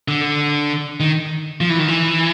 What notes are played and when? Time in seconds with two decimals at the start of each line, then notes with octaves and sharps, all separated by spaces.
0.08 D3
1.00 D#3
1.61 F3
1.70 E3
1.79 D#3
1.88 E3